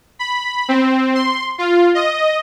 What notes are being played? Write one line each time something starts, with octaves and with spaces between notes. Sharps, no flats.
B5
C4
C6
F4
D#5